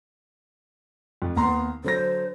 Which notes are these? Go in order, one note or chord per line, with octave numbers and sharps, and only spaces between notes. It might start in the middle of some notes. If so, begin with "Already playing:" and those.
F2
D#2 B3 A#5 C6
D3 F#3 C5 A#6